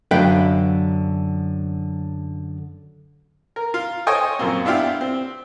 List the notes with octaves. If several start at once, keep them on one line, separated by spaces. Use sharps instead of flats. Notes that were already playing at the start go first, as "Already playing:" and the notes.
F#2 D3 B4 F5 G5
A#4
F4
A4 C5 C#5 D#5 G5 G#5
F#2 A#2 C4
B3 D4 E4 F4 G4
C4